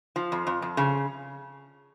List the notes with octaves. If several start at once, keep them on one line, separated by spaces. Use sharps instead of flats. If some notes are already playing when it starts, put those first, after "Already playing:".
F3
F2
F2
F2
C#3